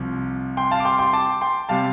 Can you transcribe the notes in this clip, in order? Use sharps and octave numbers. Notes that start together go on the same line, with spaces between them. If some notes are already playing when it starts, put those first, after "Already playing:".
Already playing: C2 C3 F3
G5 C6
F5 A5
D6
G5 C6
G5 C6
A5 D6
G5 C6
C3 G3 F5 A5